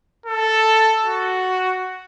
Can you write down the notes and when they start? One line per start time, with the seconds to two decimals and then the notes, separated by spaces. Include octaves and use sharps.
0.26 A4
1.03 F#4